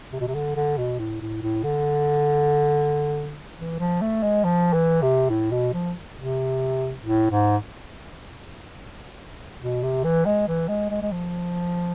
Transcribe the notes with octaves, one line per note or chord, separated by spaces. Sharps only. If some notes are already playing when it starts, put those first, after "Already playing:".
C3
B2
C3
D3
D3
B2
A2
A2
A2
D3
E3
F3
A3
G#3
F3
E3
C3
A2
B2
F3
C3
A2
G#2
B2
C3
E3
G#3
E3
G#3
G#3
G#3
F3